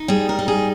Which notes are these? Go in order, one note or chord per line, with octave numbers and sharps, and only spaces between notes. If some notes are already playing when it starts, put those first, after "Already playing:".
Already playing: D#4
G3 G#4
A#4
D#4
G#4